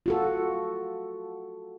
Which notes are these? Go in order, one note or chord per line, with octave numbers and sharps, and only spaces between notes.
F4 F#4 A4